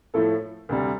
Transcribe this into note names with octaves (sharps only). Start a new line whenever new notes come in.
A2 F3 A3 E4 A4
D2 C3 G3